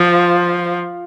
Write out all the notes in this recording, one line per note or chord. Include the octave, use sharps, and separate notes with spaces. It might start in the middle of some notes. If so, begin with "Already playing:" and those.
Already playing: F3